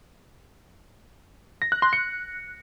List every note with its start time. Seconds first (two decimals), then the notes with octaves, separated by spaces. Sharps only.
1.62 A#6
1.72 F#6
1.82 C6
1.93 C#7